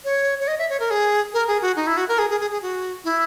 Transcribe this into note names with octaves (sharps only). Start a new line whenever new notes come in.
C#5
C#5
D#5
E5
C#5
A#4
G#4
A#4
G#4
F#4
D#4
E4
F#4
A#4
G#4
G#4
G#4
G#4
F#4
E4